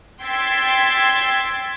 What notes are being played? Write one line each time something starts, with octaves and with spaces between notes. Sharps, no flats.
G5 C6 E6 G#6 A6 B6